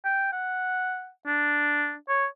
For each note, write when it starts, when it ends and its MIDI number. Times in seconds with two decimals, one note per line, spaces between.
0.05 0.30 79
0.32 1.09 78
1.27 1.94 62
2.09 2.26 73